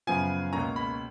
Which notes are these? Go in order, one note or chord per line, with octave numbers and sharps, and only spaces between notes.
F#2 C#3 F3 B3 G#5
C#2 B2 A#3 C#4 A#5
B5